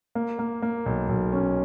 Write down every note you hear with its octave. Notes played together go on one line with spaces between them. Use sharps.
A#3
A#3
A#3
B1
B1
C#4